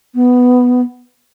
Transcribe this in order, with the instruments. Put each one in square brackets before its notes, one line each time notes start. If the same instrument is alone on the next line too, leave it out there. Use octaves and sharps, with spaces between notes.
[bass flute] B3